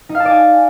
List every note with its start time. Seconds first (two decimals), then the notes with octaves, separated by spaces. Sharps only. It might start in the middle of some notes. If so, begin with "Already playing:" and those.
0.09 D#4
0.15 F5
0.20 A5
0.25 D5
0.31 G#5